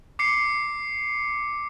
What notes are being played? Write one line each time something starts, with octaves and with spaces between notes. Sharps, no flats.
D6 C7 C#7